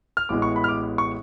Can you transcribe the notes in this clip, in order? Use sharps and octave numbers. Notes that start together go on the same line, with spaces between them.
F6
A1 A2 G#3 B3 D6
C#6
B5
F6
D6
C#6